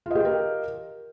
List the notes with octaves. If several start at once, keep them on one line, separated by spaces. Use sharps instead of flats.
F4 G4 A#4 D#5 G5